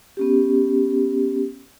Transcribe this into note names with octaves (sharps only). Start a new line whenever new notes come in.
B3 C#4 G4